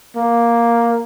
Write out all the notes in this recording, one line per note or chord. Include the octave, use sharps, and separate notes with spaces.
A#3